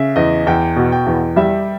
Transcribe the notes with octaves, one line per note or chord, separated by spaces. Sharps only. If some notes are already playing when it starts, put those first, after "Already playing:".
Already playing: C#3 E5
E2 D#5
E2 G5
B2
G5
E2
G3 E5